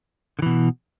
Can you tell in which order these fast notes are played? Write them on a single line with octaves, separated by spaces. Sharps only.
D3 E3 B2